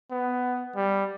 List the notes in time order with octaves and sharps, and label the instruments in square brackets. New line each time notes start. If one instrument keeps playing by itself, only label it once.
[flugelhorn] B3
G3